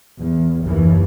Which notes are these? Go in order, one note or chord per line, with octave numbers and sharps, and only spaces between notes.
E2
F#1 D#2 E3